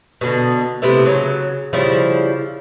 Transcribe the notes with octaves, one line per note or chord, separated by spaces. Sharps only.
B2 D3
C3 A3 B3 E4
C#3 F#3
C#3 F3 G3 E4